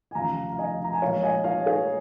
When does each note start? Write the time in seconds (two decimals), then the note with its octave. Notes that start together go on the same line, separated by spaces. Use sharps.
0.11 G#5
0.15 F1 D#2 C#3 F3 F5 A#5
0.52 F5
0.58 D#5 G#5
0.84 A#5
0.93 G#5
1.01 A#1 A#2 G#3 C#5 F5
1.23 D#5 G#5
1.44 C#5 F5
1.66 G#4 C#5